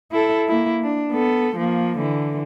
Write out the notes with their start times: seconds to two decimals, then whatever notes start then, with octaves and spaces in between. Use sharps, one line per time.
0.11 E4 A4
0.48 A#3 E4
0.83 D4
1.12 B3 A4
1.56 F3 A#3
1.98 D3 E3